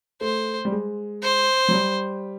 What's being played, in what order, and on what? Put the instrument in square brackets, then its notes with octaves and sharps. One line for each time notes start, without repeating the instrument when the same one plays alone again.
[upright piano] A3 [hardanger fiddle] C5
[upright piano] G3
G#3
[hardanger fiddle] C5
[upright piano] F#3
G3